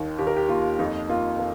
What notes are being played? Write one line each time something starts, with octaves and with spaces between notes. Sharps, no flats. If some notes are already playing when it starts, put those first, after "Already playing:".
Already playing: D#2 D#3
D#2 G4
A#4
G4
A#3 F4
F2 D#4
A#3 F4
A#3